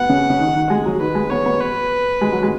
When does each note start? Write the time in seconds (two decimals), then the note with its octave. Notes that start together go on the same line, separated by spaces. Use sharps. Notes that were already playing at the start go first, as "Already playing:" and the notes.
Already playing: B3 F#5
0.09 C#3
0.30 C#3
0.40 D#3
0.55 D#3
0.70 G#3 G#4
0.86 F#3
1.00 D#3 B4
1.15 G#3
1.30 B3 C#5
1.46 B3
1.61 B4
2.21 G#3
2.32 F#3
2.43 G#3